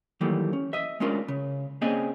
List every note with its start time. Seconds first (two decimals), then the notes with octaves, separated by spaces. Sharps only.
0.21 D#3 E3 F#3 G3 A3 A#3
0.53 C#4
0.73 D#5 E5
1.00 G#3 A3 C#4 D4 F4 A#4
1.28 C#3
1.81 A#3 C4 C#4 G#4 D5 D#5